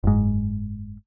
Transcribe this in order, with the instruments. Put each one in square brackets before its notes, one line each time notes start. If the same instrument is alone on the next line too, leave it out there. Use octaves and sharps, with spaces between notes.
[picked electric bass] F#1 G#2